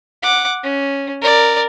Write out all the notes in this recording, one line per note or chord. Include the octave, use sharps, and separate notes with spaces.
F#5 D6
C#4
A#4 D5